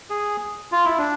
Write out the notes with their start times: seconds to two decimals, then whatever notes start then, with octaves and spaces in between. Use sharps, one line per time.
0.10 G#4
0.72 F4
0.85 E4
0.98 D4